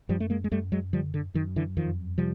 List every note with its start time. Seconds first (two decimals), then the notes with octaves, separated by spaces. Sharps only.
0.09 F#2 F3 G3
0.20 A3
0.30 G#3 A#3
0.44 G#3
0.52 F#2 G3 A3
0.72 F#3 G#3
0.93 D3 F3 G3
1.14 D3
1.34 F#2 D#3
1.56 D3 E3
1.77 F2 D#3 F3
2.18 C3 F3 G3